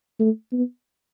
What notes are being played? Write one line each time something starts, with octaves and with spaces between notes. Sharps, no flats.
A3
B3